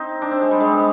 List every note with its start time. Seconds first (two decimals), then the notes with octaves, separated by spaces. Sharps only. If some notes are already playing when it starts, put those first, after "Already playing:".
Already playing: C4 D#4
0.22 D4
0.31 C4
0.41 G#3
0.51 G3
0.60 G#3
0.73 B3